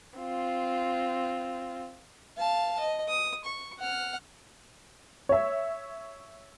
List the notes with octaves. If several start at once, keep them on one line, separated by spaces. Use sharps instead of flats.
C4 F4
F5 A5
D#5
D#6
C#6
F#5 F6
C#5 E5